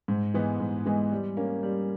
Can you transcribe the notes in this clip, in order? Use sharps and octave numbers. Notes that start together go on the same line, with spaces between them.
G#2
E3 G#3 B3
G#2
E3 G#3 B3
G3
A#3 C#4
G3